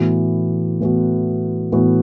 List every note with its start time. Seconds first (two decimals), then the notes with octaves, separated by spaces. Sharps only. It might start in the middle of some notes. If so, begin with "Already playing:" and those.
Already playing: A2 E3 B3 F#4
0.80 A2 E3 B3 F#4
1.72 A2 E3 B3 F#4